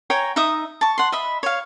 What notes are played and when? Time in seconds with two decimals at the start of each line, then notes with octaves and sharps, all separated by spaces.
0.10 C#5 G5 G#5 A#5
0.36 D#4 E5 D#6
0.81 A5 C#6
0.98 F#5 C6
1.12 D#5 E5 B5
1.43 C#5 F5